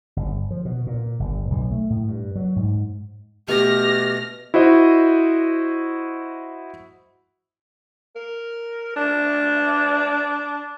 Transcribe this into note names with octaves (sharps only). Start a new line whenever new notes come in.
G1
F3
B2
A#2
G1
B1
A3
A2
G2
F#3
G#2
B2 A3 G4 C#6 F6 A#6
E4 F#4 C5 D#5
A#4
D4